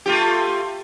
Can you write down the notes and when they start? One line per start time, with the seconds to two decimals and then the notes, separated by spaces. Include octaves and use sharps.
0.06 A3 F4 G4